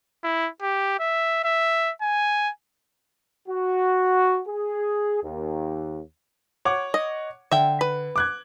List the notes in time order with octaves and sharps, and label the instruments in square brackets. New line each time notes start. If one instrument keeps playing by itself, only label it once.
[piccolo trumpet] E4
G4
E5
E5
G#5
[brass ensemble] F#4
G#4
D#2
[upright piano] C#5 F#5 D6
[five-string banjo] D#5
[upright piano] D3 [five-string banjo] E5 G5
[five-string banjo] B4
[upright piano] D6 F#6 G#6